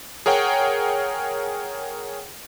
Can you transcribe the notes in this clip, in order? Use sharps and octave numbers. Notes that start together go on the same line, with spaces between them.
G#4 A#4 C#5 F#5 G5